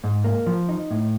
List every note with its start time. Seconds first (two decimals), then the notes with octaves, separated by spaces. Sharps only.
0.04 G#2
0.24 A#3
0.46 F3
0.69 D#4
0.91 A2